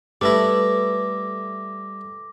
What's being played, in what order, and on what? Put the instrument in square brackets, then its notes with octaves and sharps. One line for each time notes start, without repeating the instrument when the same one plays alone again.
[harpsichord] G3 A3 E4 [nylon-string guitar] A4 B4 [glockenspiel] D6 A#6